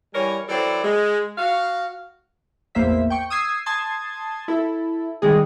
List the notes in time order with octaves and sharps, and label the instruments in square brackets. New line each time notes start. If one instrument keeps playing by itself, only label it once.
[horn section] E3 G3 A#4 C#5 G#5
E3 F#3 C4 A4 D5
G#3
F#4 F5
[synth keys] A1 E2 A#3 C5 E5 B6
G5 C#6
D#6 E6 G#6 C7
A5 C6 D#6 G#6
E4 A4
C3 D#3 G3 G#3 G#4